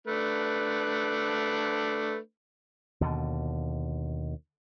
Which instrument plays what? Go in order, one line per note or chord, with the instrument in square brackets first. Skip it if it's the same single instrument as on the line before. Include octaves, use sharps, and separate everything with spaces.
[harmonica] A3 D4 B4
[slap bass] D#2 B2 D3